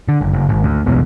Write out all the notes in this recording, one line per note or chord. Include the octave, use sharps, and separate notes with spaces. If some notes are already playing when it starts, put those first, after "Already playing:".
D3
F#1
F#1
G#1
D2
F#1 B1 E2 B2